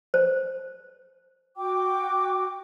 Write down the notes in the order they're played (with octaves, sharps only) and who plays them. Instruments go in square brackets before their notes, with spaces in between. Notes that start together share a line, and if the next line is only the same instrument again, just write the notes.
[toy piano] C5
[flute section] F#4 G5 D6